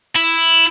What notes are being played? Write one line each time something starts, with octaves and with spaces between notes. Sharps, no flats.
E4